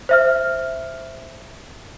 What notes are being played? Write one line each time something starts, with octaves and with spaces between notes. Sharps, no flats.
C5 E5 F6